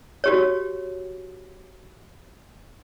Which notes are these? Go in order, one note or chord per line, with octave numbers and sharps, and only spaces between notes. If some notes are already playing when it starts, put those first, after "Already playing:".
F#4 G4 C#5